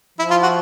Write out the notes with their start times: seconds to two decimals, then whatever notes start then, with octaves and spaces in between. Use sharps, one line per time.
0.18 F3 E4
0.31 F4
0.43 F#4